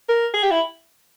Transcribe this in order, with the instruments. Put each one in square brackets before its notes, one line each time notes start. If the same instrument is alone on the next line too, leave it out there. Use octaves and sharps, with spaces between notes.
[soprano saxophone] A#4
G#4
G4
E4